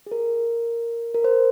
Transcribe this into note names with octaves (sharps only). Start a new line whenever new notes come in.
G#4
A#4
A#4
C5